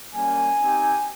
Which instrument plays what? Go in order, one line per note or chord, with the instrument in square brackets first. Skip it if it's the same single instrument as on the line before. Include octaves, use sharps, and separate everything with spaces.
[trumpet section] G3 A#3 C#4 G#5
C4 D#4 G4